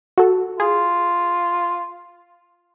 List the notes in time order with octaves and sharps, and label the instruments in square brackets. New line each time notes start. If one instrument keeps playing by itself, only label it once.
[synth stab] F#4 A4
[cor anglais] F4 [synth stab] G#4